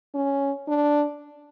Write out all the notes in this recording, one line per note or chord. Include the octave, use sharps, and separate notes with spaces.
C#4
D4